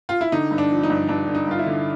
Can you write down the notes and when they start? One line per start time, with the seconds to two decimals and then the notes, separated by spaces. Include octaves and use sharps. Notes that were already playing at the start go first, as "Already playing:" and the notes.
0.09 F4
0.21 E4
0.32 D3 D#4
0.51 G2
0.58 D4
0.71 F3
0.83 D#4
0.90 G2
1.09 G2 D4
1.28 D3
1.35 D#4
1.47 G2 F4
1.59 E4
1.66 D3